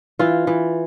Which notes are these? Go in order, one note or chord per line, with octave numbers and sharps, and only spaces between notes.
E3 F4
E3